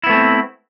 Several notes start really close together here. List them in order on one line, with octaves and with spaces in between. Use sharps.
E4 B3 A3 C4